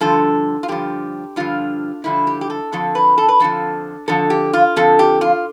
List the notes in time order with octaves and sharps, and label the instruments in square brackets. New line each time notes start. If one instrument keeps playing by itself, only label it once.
[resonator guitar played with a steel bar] G2 D3 F3 A4
F4
G2 D3 F3 G4
G2 D3 F3 F4
G2 D3 F3 E4
G4
G4
A4
F2 D3 F3 A4
B4
A4
B4
F2 D3 F3 A4
F2 D3 F3 A4
G4
F4
F2 D3 F3 A4
G4
F4